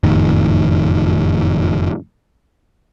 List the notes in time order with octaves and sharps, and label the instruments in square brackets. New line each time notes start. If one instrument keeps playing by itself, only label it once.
[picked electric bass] F#1 F2 A2 D#3